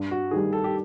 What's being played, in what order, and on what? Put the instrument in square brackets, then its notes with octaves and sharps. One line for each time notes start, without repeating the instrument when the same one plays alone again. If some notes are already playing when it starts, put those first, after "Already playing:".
Already playing: [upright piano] G2
[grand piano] F#4
[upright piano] D#3 G3 [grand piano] G#4
[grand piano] A4
G4